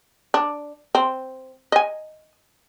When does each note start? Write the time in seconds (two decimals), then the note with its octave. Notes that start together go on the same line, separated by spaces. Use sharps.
0.34 D4
0.95 C4
1.72 D#5 G#5